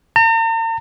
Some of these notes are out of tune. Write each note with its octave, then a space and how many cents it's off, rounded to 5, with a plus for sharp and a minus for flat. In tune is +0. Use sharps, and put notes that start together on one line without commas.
A#5 -45